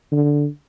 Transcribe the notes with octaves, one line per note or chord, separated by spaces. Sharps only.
D3